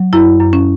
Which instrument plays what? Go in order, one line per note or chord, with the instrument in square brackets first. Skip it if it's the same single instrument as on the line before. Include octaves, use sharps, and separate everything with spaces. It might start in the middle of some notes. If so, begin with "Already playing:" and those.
Already playing: [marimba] F#3
F#2 E4
F#2
C#4